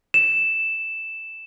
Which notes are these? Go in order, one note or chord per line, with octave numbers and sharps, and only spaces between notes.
E7